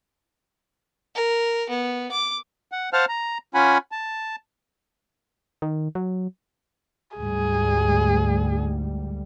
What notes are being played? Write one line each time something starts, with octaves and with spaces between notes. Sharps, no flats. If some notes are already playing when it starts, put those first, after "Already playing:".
A#4
B3
D6
F#5
C5 F5 F#5 A5 F6
A#5
C#4 F4 F#5 G#5 B5
A5
D#3
F#3
D2 G#2 G3 G#4